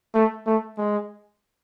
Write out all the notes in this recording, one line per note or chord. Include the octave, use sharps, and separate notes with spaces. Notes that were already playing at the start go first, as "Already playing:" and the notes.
A3
A3
G#3